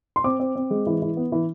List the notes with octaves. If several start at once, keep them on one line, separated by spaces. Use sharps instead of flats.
C6
C4 D6
C4
C4
G#3
E3
E3
B3
E3